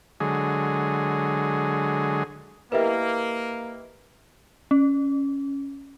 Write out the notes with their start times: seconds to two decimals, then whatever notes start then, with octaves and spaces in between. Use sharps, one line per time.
0.20 D3 F#3 G#3 G#4
2.72 A#3 E4 G4 A#4 B4 D#5 E5
4.71 C#4